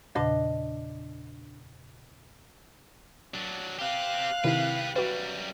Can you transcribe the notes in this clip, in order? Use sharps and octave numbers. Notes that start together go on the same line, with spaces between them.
E2 A#2 C#3 D4 D#5
F#3 D4
C4 G4 F5 F#6
C3 D#3 E4 G4 B4
F#2 G3 F#4 B4